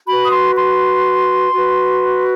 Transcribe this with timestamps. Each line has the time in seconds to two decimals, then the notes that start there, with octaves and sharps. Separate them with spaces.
0.07 F#4 B4 B5
0.25 D#6
0.31 C6
0.56 C6
1.54 F#4 B4